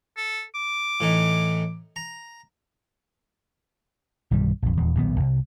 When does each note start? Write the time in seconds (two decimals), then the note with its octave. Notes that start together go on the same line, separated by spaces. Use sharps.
0.17 A4
0.55 D6
1.00 A2 E3 D#4
1.96 A#5
4.31 B1 G2 D#3 G3
4.62 A#1 F2
4.77 D#1 E2
4.95 D#1 B1 D#3 B3
5.20 C2